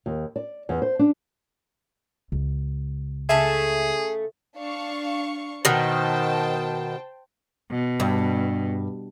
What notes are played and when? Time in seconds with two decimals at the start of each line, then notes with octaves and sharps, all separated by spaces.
0.06 D#2
0.36 D5
0.69 E2
0.82 C5
0.99 D4
2.32 C#2
3.29 C#3 A3 G#4 E5 A5
4.57 D4 F5 C#6
5.65 B2 D#3 C5 G5 A5
7.71 B2
8.00 G2